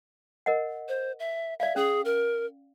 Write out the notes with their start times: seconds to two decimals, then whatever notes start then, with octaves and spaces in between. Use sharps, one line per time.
0.46 A#4 D#5 F#5
0.88 C5
1.19 E5
1.60 D5 E5 F5
1.76 C#4 G#4
2.05 A#4